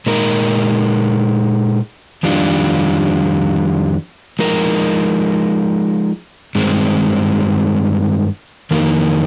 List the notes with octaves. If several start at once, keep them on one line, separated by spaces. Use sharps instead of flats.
A#2 G#3 D#4 A#4
F2 D#3 G3 D4 F4
F3 G#3 D#4 A#4
G2 D#3 G#3 C4
F2 D#3 A#3 D#4 A#4